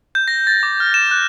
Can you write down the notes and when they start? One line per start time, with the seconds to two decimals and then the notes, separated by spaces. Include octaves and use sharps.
0.15 G6
0.28 A#6
0.47 A6
0.63 D6
0.80 F6
0.94 E7
1.11 F#6